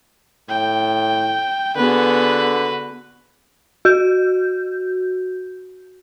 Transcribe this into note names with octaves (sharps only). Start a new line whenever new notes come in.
A2 G5
D3 B3 F#4 G#4 B4
F#4 G6